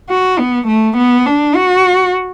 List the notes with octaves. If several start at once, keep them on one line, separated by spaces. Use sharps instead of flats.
F#4
B3
A3
B3
D4
F#4